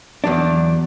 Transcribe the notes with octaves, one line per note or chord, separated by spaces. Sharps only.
E2 F#3 D4